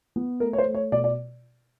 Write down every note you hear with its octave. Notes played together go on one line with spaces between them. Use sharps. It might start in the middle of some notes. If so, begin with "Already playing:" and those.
B3
A3 A#4
C#5
C5
A3
C#5
B2 D5
D5